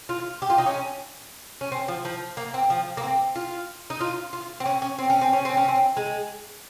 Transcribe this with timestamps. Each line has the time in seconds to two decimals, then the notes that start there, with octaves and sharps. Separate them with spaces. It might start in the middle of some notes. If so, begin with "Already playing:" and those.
0.09 F4
0.42 G4
0.50 F4
0.58 D#4
0.66 C#4
1.61 C#4
1.72 C4
1.88 F3
2.05 F3
2.37 A#3
2.54 C4
2.70 F3
2.97 A#3
3.03 C4
3.36 F4
3.90 D#4
4.01 F4
4.33 F4
4.60 C4
4.66 C#4
4.82 C#4
4.98 C4
5.10 C#4
5.21 C4
5.33 C#4
5.45 C4
5.57 C#4
5.68 C4
5.97 G#3